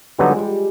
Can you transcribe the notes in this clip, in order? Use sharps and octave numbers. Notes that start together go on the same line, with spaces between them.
D3 F#3 G3 B3 D#4
G#3
G3